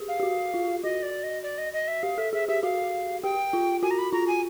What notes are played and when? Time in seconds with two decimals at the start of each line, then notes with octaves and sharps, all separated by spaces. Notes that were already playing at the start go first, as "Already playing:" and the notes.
Already playing: G4 G#4
0.08 F5
0.20 G4
0.23 F#4
0.54 F4
0.83 F#4 D#5
1.03 D5
1.23 D#5
1.43 D5
1.58 D#5
1.73 D#5
1.88 E5
2.03 G4 F5
2.18 A4 E5
2.33 G#4 E5
2.48 G4 E5
2.63 F#4 F5
3.23 G4 G5
3.53 F4
3.83 F#4 G#5
3.91 A#5
3.98 B5
4.13 F4 A#5
4.28 G#5